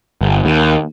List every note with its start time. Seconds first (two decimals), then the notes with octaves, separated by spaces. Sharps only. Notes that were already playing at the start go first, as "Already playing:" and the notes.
0.21 G1
0.45 D#2